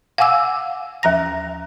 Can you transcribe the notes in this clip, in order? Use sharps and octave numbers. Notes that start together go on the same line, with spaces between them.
F5 F#5 G#5 D6 E6
D#2 F3 A#5 A#6